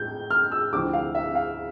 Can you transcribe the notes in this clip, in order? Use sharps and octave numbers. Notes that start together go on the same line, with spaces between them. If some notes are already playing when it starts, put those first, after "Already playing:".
Already playing: A2 G6
F6
E6
D2 C3 F3 C4 E4 D6
F5
E5
F5